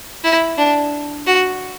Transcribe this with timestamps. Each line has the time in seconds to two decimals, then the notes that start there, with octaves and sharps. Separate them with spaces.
0.24 E4
0.58 D4
1.27 F#4